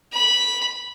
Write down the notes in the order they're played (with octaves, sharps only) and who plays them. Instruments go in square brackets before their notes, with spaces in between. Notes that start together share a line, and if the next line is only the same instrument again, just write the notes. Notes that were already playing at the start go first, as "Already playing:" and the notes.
[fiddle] B5